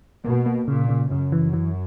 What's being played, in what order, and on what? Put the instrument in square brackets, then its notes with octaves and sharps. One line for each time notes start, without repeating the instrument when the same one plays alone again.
[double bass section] B2 [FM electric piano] A#3
[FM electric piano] A#3
[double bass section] A#2 [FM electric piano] C#3
[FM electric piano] C#3
[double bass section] F#2 [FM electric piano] C#3
[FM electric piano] E3
E3